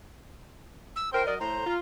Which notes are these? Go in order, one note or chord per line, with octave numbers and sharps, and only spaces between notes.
E6
E4 A#4 C5 G5
F#3 A#4 D5 D#5
A2 C5 A#5
F4